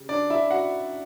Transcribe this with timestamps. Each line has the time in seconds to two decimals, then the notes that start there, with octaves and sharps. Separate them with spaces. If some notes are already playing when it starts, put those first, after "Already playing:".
Already playing: C#3 G3
0.09 D4 D5
0.30 E4 E5
0.51 F#4 F#5